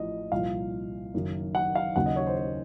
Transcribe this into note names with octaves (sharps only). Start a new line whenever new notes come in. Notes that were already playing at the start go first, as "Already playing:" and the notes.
Already playing: A1 A2 F3 D#5
C2 A#2 F3 F5
F#1 F#2 D#3
F#5
F5
D#2 C#3 F#3 F#5
D#5
C#5
C5
C5